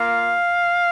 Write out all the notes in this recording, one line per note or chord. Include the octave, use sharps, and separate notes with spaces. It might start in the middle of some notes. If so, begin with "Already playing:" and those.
Already playing: A#3 F4 F5